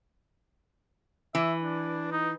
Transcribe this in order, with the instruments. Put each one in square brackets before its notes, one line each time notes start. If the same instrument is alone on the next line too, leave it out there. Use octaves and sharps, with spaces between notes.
[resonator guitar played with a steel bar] E3 [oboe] E5
[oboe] D4
D#4